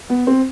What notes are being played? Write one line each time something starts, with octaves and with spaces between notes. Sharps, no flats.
B3
C4